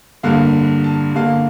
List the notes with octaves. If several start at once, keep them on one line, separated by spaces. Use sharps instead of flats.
G2 D3 G3 A#3 F5
A5
G2 D3 G3 A#3 F5